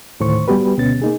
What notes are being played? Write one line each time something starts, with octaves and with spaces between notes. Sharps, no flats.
D2 A2 D#3 C5 C#6
G3 B3 F#4 G4 B4
D2 B2 B3 C#4 A6
A#3 D#4 G#4